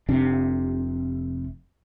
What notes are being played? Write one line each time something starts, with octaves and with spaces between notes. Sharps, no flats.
F1 C3 D4